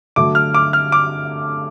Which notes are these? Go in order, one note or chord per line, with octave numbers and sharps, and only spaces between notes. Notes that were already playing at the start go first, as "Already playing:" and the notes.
D3 F#3 A3 D6
F6
D6
F6
D6